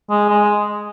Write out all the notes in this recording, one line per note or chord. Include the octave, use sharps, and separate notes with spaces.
G#3
G#3